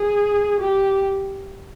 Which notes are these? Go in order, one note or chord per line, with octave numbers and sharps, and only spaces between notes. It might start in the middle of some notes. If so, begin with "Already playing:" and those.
Already playing: G#4
G4